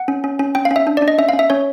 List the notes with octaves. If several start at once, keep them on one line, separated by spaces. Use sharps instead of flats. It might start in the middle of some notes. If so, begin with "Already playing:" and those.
Already playing: F#5
C#4
C#4
C#4
C#4 G5
F5
C#4
E5
D4
D5
D4
D#5
C#4 E5
F5
C#4
E5
C#4 C#5